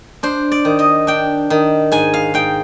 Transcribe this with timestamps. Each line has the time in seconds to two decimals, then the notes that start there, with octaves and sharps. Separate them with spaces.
0.23 D4 C5
0.52 D5
0.65 D#3
0.79 D#5
1.07 D4 G5
1.50 D#3
1.92 G#2 G#5
2.14 F5
2.34 G#2 G5